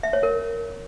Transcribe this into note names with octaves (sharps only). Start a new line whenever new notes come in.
E5
C#5
A#4